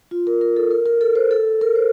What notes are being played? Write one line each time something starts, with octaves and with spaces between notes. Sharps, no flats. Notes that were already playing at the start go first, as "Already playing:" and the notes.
F4
A#4
A#4
A4
A#4
A#4
A4
C5
A4
A#4
C5